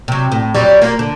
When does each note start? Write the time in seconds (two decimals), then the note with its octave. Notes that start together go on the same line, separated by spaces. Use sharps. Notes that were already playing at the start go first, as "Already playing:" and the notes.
0.08 C3 F#3
0.32 A2
0.54 F2 F#3 G3
0.82 A#3 F4
0.99 D3